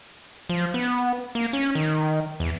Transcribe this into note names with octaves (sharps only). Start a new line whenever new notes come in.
F3
B3
A#3
C#4
D#3
E2